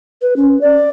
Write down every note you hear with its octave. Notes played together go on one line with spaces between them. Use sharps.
B4
C#4
D5